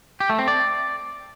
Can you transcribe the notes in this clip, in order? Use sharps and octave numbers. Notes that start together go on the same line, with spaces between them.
G4
A3
C4
D5